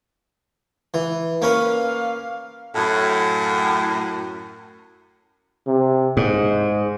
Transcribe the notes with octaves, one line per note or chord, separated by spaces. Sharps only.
E3
A#3 C#4 B4 F5
F#2 A2
C3
G#2 G#3